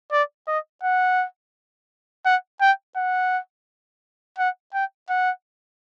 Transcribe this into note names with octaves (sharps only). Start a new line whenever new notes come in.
D5
D#5
F#5
F#5
G5
F#5
F#5
G5
F#5